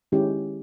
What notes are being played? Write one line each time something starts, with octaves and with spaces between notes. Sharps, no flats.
D#3 G#3 C#4 E4 G4